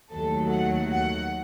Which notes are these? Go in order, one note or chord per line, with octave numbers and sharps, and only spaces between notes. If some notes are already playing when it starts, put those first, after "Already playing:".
D#2 D#3 F#3 A3 A4
F#5
F#5